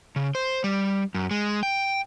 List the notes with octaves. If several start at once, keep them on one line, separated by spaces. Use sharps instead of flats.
C#3
C5
G3
F#2
G#3
G5